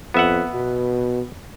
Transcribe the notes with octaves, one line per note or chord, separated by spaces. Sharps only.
F2 B3 E5 F#5
B2